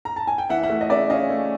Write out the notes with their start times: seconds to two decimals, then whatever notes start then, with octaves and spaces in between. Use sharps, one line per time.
0.05 A#5
0.16 A5
0.27 G#5
0.38 G5
0.49 E3 E5 F#5
0.63 E5 F#5
0.69 A3
0.81 D#5
0.90 C#3 D5 E5
1.09 C#4 D#5 F5
1.30 A3